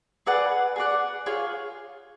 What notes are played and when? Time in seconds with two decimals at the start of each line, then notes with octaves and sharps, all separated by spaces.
0.27 G#4 B4 D5 F#5
0.76 G#4 B4 D5 F#5
1.26 F4 G#4 C#5